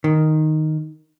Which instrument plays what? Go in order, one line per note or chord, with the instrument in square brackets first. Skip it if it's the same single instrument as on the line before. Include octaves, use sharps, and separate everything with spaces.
[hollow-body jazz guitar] D#3